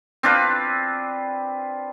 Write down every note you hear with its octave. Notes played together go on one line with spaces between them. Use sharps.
C4 D4 F4 B4